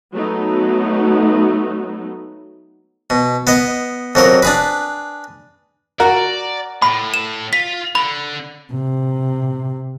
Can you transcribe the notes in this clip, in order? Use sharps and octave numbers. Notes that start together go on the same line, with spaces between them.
F#3 A3 B3 D#4
B2
B3 D#5
F2 F#3 A#4
D4 G#4 B4
F#4 A#4 D5
A2 B5
E7
F4 B6
D3 B5
C3